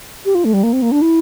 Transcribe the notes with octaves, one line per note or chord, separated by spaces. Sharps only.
G4
F4
A3
G3
A#3
C4
A#3
D4
E4